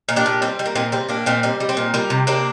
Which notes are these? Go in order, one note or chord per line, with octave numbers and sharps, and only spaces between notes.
A#2
D4 G4
A#2
G3 C4
G3
A#3
A#2 C4
G3 C4
A#2 A#3 D4
A#2 C4
G3 C4
G3
C4
A#2
G3 F4 A#4
C3
C3 A#3 D4